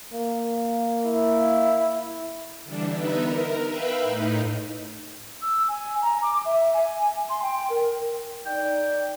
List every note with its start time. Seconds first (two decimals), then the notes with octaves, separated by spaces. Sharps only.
0.14 A#3
1.06 E4
2.63 D3 E3 G3 D4
2.92 B3 D#4 B4 E5
3.23 A#4
3.66 B4 E5 F5 G5 B5
4.01 A2 D#4
5.42 E6
5.68 G#5
6.02 A#5
6.22 D6
6.45 E5
6.74 G#5
7.29 C6
7.42 G5
7.70 A#4
8.46 D#4 D5 G5